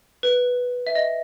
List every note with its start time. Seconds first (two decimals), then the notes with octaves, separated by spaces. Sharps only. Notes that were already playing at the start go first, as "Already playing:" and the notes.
0.23 B4
0.87 E5
0.95 D#5